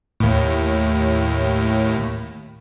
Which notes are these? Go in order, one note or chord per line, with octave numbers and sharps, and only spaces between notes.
D#2 A2